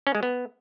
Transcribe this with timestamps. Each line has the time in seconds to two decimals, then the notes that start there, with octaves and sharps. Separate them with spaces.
0.07 C#4
0.15 G#3
0.23 B3